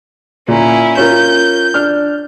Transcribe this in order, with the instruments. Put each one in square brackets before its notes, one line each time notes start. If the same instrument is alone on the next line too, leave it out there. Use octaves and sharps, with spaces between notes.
[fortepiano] A#2 [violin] C#4 E4
[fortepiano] C#4 F4 A#4 [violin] G6
[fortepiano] D4 F6